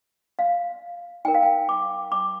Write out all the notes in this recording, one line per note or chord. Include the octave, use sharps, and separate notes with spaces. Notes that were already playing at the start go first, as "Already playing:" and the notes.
F5
D#4 A#4 G5
F5
G5
D6
D6